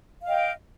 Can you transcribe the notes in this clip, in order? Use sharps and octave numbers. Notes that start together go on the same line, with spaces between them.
D#5 F5 G5